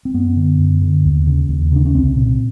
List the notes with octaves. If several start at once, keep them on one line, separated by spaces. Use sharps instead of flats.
C4
F#2 B3
D3
F#2
D3
D#2
C#3
D#2
C#3 D4
C#4
C2 C4
A#2